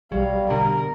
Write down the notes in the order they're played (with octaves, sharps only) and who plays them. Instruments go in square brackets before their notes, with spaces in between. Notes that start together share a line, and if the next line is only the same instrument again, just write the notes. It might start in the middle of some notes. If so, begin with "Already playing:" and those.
[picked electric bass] B1 F#3 [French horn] G3 [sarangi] F5
[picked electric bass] B2 D3 [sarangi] A#4